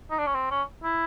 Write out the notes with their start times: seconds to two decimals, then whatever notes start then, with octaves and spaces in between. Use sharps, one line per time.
0.10 D#4
0.19 D4
0.26 C#4
0.35 C4
0.51 C#4
0.84 E4